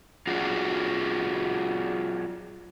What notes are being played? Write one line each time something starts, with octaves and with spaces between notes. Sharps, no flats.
F#3 F4 F#4 G#4